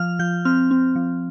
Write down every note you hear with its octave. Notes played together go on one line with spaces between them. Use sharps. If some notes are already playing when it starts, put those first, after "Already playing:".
Already playing: F3 F6
F3 G6
C4 F6
C4
F3